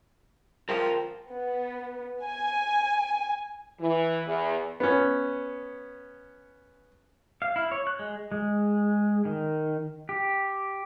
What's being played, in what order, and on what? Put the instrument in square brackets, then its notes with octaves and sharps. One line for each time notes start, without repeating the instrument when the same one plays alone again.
[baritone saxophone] F3 [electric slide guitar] A#4 C5 G5
[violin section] B3
G#5
[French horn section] E3
E2
[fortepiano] B3 C#4
[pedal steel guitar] F5
E4
C#5
F#6
G#3
G#3
D#3
G4